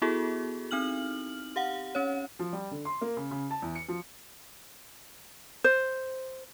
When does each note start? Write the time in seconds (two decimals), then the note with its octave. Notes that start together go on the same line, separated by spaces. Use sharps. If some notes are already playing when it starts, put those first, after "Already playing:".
0.02 B3 E4 F#4 G#4 A4
0.71 C4 D#4 F6 F#7
1.56 G4 F5 F#5
1.95 C#4 C#5
2.39 F3
2.53 G3
2.71 D3
2.85 C6
3.01 A#3
3.17 C#3
3.31 C#3
3.51 A5
3.62 E2
3.75 C#7
3.88 F3
5.64 C5